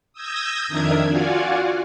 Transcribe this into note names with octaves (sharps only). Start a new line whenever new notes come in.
D#6 E6 G6 G#6 A#6
F2 D#3 D4 A#4 E5 G#6
F4 F#4 D5 F5 F#5 G#5